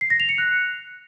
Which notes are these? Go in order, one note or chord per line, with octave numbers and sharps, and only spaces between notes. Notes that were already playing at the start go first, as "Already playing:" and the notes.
C7
A#6
F7
C#7
F#6